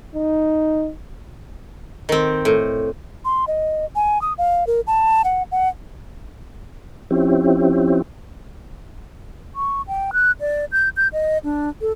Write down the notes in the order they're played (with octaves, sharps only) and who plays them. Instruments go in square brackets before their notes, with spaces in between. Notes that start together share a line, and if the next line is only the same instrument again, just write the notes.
[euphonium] D#4
[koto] D#3 C4
A2
[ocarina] C6
D#5
G#5
D#6
F5
A#4
A5
F#5
F#5
[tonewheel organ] F3 C4 C#4 E4 G4
[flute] C#6
G5
F#6
D5
G6
G6
D#5
D4
A4